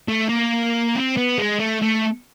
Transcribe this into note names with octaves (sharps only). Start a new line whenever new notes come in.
A3
A#3
C4
B3
G#3
A3
A3